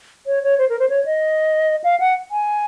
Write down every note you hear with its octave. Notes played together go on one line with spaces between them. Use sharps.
C#5
C#5
C5
A#4
C5
C#5
D#5
F5
F#5
G#5